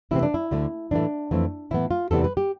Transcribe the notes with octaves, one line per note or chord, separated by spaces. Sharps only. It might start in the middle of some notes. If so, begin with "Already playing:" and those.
C3 E3 A3 C4 E4
D4
E4
D2 D3 A3
A2 E3 A3 D4
F2 E3 A3 C4
A2 E3 B3 E4
F4
E2 C3 E3 G3 B3 A4
B4
G4